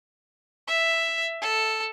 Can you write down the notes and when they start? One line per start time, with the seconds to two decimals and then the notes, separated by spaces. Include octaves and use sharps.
0.67 E5
1.41 A4